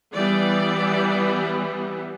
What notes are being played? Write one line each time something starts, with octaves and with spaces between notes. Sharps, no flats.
E3 G3 B3 D5